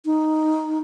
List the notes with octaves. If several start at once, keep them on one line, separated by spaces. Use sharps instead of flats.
D#4